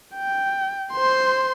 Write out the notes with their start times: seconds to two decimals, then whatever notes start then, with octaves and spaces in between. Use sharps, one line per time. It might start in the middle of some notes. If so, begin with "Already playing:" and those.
0.15 G5
0.93 C5 C6